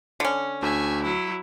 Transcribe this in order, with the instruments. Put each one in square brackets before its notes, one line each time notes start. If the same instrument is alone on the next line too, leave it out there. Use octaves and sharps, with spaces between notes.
[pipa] D3 C#4
[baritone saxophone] D2 [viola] E5 G#5
[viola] F#3 E4